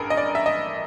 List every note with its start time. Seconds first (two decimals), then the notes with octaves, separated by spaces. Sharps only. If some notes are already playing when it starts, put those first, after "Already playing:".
Already playing: A1 G2 G#4 A#4
0.10 D#5
0.17 D5
0.35 E5
0.46 D#5